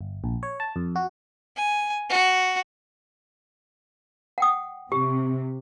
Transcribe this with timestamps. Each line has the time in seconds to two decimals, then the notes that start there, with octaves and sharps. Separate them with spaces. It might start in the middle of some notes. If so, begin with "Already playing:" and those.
0.01 G1
0.24 A#1
0.43 C#5
0.60 A5
0.76 F2
0.96 F#4
1.57 G#5
2.09 F#4
4.38 F#5 G5 D#6
4.92 C3 G4